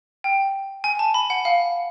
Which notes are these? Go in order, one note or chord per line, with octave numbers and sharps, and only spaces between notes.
G5
G#5
A5
B5
F#5
F5